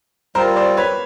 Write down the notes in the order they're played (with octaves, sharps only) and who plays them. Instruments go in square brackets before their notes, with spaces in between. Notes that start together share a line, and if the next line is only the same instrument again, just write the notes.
[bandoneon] G3 C4 F4 [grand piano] A#4 C5
[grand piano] C5 D5
B4 C#5